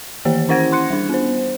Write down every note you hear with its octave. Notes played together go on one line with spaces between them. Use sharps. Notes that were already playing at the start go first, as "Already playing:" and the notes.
D#3 E3 A#3 G4 C5
C#4 E4 C5 F#5 G#6 A#6
C6 F#6 C#7
G3 D4
B3 C5